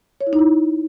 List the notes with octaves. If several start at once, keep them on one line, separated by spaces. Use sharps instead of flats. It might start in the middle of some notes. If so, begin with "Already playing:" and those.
C#5
E4
D#4
E4